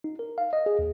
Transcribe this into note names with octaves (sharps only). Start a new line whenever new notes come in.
D#4
A#4
F5
D#5
G#4
D#2